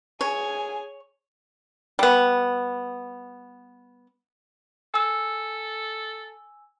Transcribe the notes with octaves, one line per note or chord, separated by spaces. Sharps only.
G#4 C#5 G#5
G3 B3
A4 G#5 E6